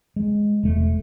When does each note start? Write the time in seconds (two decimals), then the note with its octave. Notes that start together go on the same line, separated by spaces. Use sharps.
0.16 G#3
0.63 E1 A3